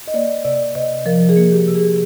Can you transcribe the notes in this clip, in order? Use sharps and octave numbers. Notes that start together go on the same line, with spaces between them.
D#5
A#3 D5
C3 D5
C3 D#5
F3 A#4
G#4
A#3
G4
C3
G#4